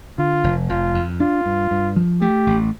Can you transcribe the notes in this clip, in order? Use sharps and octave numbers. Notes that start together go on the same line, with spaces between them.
D3 F4
F1
F1 F4
F2
D4 F4
G2
G2
F3
A3 G4
A1